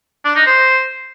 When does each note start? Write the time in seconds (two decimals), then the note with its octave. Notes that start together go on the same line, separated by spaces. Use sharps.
0.25 D4
0.36 D#4
0.46 C5